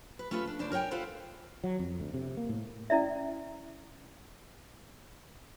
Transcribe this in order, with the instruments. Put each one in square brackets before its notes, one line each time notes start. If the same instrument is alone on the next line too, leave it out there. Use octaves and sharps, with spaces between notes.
[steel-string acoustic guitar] B4
A3 C#4 F4 A4 B4
D4
C#3 D4 C5 D5
A#4 C#5 F5 G5 G#5
F4 A4 B4 C5 F5 F#5
[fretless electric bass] F#3
F2
D2
C3
A#3
A2
[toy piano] C#4 E4 D5 E5